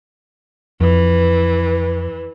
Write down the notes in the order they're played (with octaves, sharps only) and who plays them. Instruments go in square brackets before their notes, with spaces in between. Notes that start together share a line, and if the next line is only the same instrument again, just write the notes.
[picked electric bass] F2 [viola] E3